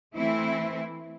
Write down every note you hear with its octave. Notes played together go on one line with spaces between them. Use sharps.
E3 A3 C4 E4